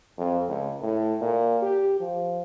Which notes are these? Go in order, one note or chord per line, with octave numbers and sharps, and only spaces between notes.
F2
C#2
A2
A#2
G4
F3